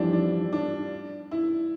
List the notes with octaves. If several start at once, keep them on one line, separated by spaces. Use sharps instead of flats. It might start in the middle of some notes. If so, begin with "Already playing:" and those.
Already playing: F2 E3 F3 G3 D4 E4
D4
D4
E4